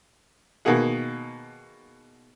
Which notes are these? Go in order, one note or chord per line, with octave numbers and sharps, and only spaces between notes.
B2 D#3 A#3 G#4 F#5